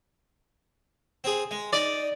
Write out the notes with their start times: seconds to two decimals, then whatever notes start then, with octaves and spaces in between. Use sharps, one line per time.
1.24 C4 G#4
1.51 G#3
1.73 D#4 D5